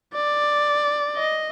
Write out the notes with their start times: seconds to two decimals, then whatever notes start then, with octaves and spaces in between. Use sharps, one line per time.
0.15 D5
1.16 D#5